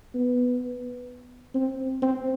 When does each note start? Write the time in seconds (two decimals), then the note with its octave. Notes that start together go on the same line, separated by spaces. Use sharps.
0.14 B3
1.55 C4
2.02 C4